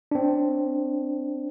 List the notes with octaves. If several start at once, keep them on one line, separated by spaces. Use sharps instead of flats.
C4 D4